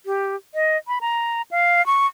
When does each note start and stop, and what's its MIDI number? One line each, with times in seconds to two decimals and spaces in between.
0.06 0.36 67
0.54 0.77 75
0.88 0.99 83
1.01 1.42 82
1.51 1.84 77
1.86 2.07 85